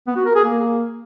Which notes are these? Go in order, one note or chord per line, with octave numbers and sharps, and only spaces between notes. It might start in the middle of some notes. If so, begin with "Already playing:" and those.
B3
F#4
A#4
G#4
A#3